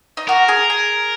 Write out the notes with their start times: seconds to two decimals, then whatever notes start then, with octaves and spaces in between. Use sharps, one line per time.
0.17 D#4
0.28 F#4 A#4
0.48 G#4
0.70 G#4